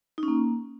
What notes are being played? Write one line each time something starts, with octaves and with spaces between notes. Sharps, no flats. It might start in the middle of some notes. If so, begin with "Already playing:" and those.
D#4
C#4
A#3